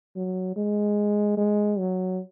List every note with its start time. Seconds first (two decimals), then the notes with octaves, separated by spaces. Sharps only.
0.16 F#3
0.56 G#3
1.37 G#3
1.79 F#3